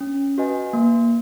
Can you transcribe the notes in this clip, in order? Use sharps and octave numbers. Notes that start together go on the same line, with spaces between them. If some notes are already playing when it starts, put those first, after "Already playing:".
C#4
F#4 B4 D#5 G#5
A#3